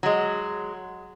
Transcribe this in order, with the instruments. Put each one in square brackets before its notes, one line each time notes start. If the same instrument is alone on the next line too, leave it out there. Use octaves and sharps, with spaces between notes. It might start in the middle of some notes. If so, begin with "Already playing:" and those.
[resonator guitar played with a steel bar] F#3 G#3